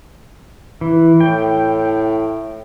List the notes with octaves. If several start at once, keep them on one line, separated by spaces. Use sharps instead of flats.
E3
A2 G5